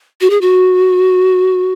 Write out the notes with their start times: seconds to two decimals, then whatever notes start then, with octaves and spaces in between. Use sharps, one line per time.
0.21 F#4
0.30 G#4
0.41 F#4